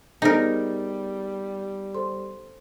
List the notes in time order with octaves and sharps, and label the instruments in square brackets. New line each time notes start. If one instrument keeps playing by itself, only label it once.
[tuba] G3 [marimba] B3 G#4 C5 [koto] D#4 A#4
[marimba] A4 C5 C6